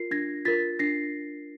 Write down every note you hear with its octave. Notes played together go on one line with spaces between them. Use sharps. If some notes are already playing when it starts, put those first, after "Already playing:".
Already playing: F4 A#4 C7
D4 G#6 A#6
F4 A#4 A6 B6
D4 A#6 C7